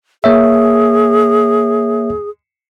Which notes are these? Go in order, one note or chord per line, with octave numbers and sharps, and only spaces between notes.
A#3 G#4 C#5 E5